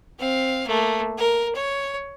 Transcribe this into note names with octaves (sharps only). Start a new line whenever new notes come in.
C4 F5
A3 A#3
A#4
C#5